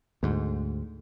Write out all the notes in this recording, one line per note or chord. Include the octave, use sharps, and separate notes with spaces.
D2 G#2